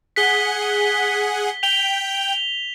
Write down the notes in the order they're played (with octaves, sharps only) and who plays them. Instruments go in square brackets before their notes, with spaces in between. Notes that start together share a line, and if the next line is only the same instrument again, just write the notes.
[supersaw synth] G#4 F#5 [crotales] B6 G7
[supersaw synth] G5 [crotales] F7 G7